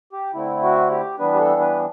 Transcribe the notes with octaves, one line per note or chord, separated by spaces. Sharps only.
G4
D3 A3 C4 E4
F#4
G4
E3 G3 B3 D4 B4
G4
A4
B4